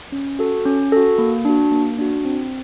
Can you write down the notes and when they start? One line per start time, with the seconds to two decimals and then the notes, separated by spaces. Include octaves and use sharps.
0.12 C#4
0.39 F#4 A4
0.65 C#4
0.92 F#4 A4
1.18 A#3
1.45 D4 F#4
1.71 A#3
1.99 D4 F#4
2.25 C4